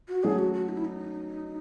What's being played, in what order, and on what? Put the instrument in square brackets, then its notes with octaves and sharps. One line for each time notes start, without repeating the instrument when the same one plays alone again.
[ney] F#4
[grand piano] F#3 A3 C#4 [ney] G#4
[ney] F#4
F#4
D#4
E4
D#4